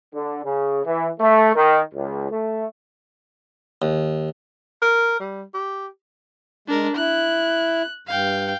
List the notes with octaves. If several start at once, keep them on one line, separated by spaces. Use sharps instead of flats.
D3
C#3
E3
A3
D#3
C#2
A3
D#2
A#4
G3
G4
G#3 D4 A#4
E4 F#6
G2 F5 G5